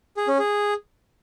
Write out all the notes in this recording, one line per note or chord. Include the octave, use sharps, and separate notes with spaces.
G#4
C#4
G#4